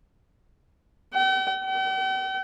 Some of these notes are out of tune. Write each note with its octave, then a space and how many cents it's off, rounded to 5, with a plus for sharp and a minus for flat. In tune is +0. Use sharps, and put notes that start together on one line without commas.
G5 -45
G5 -45